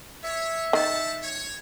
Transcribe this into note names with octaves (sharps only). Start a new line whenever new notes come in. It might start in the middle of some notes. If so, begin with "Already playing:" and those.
C#5 E5
D#3 C5 F#5 A5
C#5